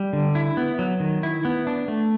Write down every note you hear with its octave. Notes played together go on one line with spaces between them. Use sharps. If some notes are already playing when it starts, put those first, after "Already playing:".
Already playing: G3
D3
E4
B3
F#3
D#3
E4
B3
D4
A3